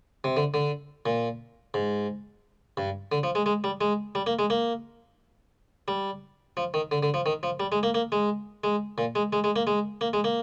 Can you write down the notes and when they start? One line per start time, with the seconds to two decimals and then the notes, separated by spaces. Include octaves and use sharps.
0.24 C3
0.37 D3
0.54 D3
1.06 A#2
1.74 G#2
2.77 G2
3.12 D3
3.23 F3
3.35 G#3
3.46 G#3
3.64 G3
3.81 G#3
4.15 G3
4.27 A#3
4.39 G#3
4.50 A#3
5.88 G3
6.57 F3
6.74 D#3
6.91 D3
7.03 D3
7.14 F3
7.26 D#3
7.43 F3
7.60 G3
7.72 G#3
7.83 A#3
7.94 A#3
8.12 G#3
8.64 G#3
8.98 A#2
9.15 G#3
9.33 G#3
9.44 G#3
9.56 A#3
9.67 G#3
10.01 A#3
10.13 G#3
10.24 A#3